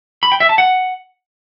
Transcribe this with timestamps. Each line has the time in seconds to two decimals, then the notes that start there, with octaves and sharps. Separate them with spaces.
0.23 B5
0.32 G5
0.40 E5
0.49 A5
0.58 F#5